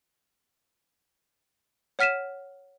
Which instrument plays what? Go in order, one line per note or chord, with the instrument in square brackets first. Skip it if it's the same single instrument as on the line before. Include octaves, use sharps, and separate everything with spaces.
[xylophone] C#5 F#5 F6 B6 D#7 E7